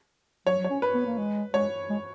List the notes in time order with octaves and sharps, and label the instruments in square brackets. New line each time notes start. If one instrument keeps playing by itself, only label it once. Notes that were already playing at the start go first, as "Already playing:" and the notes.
[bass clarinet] F#3 [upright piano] C#5
[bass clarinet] F#3
[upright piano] C#5
[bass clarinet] C#4
[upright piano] B4
[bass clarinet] B3
A#3
G#3
[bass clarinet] G#3 [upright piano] C#5
[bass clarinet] G#3